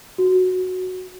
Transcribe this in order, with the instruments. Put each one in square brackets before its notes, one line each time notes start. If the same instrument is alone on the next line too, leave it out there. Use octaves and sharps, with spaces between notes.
[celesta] F#4